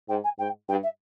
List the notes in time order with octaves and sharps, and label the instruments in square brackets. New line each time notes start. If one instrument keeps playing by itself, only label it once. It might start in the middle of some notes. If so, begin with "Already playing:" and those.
[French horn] G#2 [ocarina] G5
[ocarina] G#5
[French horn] G#2 [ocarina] G5
[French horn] G2 [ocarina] G5
[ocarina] E5